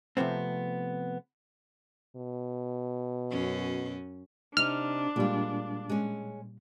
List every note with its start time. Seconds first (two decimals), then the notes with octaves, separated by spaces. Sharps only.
0.17 C3 F3 A3 B3 C4
2.16 B2
3.31 F#2 C#4
4.57 C3 D4 D#4 F6
5.16 A#2 G3 G#3 F4
5.90 G#3 C#4